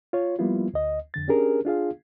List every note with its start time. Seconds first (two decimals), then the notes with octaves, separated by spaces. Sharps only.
0.13 F4 C#5
0.39 F3 G3 A#3 B3 E4 F4
0.74 D2 D#5
1.14 F2 D3 A6
1.28 C#4 D4 G4 G#4 A#4
1.65 D4 F4 G#4 F5